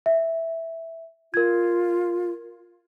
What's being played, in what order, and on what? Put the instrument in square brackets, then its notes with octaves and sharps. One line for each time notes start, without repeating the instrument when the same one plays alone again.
[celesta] E5
[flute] F4 [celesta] A#4 G#6